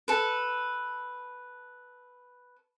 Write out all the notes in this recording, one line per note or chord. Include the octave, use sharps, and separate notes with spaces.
A4 B4